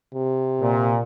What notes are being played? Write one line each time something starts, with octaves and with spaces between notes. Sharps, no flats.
C3
A#2